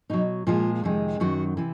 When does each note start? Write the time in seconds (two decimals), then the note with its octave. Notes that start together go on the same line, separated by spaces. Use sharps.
0.10 B2 F#3 D#4
0.47 A#2 F3 G#3 F4
0.84 F2 C3 D#3 G#3
1.20 F#2 D#3 F#3 F#4
1.57 C3 E3